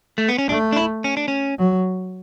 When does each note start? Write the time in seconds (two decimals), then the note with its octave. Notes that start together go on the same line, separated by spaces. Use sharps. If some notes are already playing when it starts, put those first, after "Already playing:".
0.18 A3
0.28 B3
0.38 C#4
0.49 A3 D4
0.72 D4
0.76 E4
1.04 C#4
1.17 D4
1.28 C#4
1.59 F#3